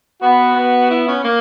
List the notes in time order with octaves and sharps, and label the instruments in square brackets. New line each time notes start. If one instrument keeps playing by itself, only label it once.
[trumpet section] B3 [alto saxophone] F#4
[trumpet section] B3
[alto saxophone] E4
C#4
A#3